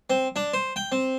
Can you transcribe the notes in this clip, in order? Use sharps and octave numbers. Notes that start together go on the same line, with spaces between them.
C4
D4
C5
G5
C4